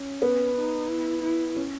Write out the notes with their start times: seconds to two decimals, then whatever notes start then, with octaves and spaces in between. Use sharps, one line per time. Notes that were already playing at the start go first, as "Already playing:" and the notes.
Already playing: C#4
0.22 B3 B4
0.55 D#4
0.89 E4
1.23 E4
1.56 C#4 C#5